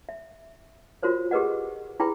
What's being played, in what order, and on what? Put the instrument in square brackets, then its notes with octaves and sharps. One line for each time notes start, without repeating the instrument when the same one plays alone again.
[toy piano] E5
F4 F#4 A#4 C5 C#5
G4 G#4 A#4 B4 D#5 F#5
E4 G4 G#4 B4 G5 B5